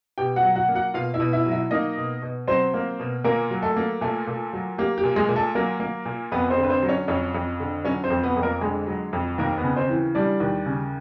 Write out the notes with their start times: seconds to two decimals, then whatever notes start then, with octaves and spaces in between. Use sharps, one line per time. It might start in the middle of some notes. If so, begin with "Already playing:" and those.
0.18 B2 G4 G5
0.36 F#4 F#5
0.43 F#3
0.56 F#4 F#5
0.68 A#3
0.75 F#4 F#5
0.94 B2 F4 F5
1.14 E4 E5
1.20 B2
1.33 E4 E5
1.46 F#3
1.52 E4 E5
1.71 A#3 D#4 D#5
1.97 B2
2.22 B2
2.48 F#3 C4 C5
2.74 A#3
3.00 B2
3.24 A#2 A#3 A#4
3.51 F#3
3.62 A3 A4
3.76 A#3
4.01 A#2 A3 A4
4.27 A#2
4.53 F#3
4.78 A#3 G4
4.98 G4
5.03 A#2
5.16 G#3 G#4
5.29 A#2
5.36 A3 A4
5.55 F#3 A#3 A#4
5.80 A#3
6.05 A#2
6.32 F2 B3 B4
6.50 C4 C5
6.58 D3
6.64 B4
6.70 C4 C5
6.83 F#3
6.89 C#4 C#5
7.08 F2 C#4 C#5
7.34 F2
7.60 D3
7.85 F#3 C#4 C#5
8.04 C4 C5
8.10 F2
8.23 B3 B4
8.37 F2
8.42 A#3 A#4
8.61 D3 G#3 G#4
8.87 F#3
9.13 F2
9.38 D#2 A#3 A#4
9.58 B3 B4
9.64 C#3
9.76 C4 C5
9.89 E3
10.15 G3 D4 D5
10.40 D#2
10.66 C#3